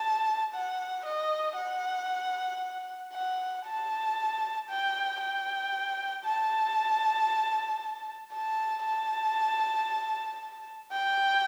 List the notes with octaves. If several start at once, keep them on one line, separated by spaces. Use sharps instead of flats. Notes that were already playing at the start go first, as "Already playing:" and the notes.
Already playing: A5
F#5
D#5
F#5
F#5
A5
G5
G5
A5
A5
A5
G5